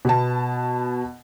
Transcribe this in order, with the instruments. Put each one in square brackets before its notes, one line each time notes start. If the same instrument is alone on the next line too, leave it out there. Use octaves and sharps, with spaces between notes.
[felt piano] B2 B3 A5